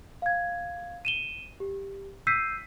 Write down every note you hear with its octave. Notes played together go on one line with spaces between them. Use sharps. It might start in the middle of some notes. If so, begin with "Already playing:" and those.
F5 G#6
D#7 E7 G7
G4
E6 G6 B6 C7 D#7